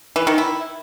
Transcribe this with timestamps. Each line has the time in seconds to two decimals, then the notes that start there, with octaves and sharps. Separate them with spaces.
0.16 E3
0.27 D#3
0.38 E4